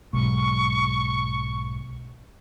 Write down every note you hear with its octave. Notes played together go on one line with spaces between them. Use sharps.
B1 G#2 C#6